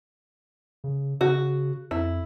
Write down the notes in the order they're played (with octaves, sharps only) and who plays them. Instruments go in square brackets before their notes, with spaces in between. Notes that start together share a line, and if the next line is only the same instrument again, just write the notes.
[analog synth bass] C#3
[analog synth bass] C#3 [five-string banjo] F#4
[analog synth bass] F2 [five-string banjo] E4